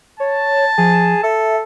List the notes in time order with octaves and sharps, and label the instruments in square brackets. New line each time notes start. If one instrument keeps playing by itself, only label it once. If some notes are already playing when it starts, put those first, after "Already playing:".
[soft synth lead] C#5 [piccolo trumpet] A5
[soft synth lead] F3 [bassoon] G#4
[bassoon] A4 [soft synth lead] E5